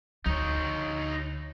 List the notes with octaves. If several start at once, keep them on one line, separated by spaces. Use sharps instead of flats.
D2 D#4 C#5